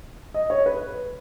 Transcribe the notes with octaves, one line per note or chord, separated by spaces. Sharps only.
D#5
C#5
B4